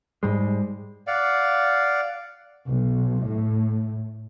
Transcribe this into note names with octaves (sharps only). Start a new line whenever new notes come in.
G#2 G3 G#3
D5 F5 F#5
B1
A2